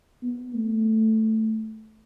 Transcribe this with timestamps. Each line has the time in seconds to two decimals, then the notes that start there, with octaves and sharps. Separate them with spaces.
0.23 B3
0.54 A3